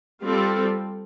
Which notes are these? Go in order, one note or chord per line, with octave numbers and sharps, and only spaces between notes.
G3 C4 F4 A4